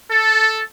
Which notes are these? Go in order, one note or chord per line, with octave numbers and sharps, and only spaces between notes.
A4